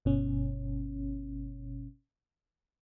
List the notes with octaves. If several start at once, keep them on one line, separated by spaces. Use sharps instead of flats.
G1 B2 C#4